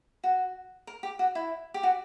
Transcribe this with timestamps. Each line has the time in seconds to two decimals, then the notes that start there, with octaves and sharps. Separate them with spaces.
0.24 F#4
0.87 A#4
1.03 G4
1.19 F#4
1.35 E4
1.74 G4
1.83 F#4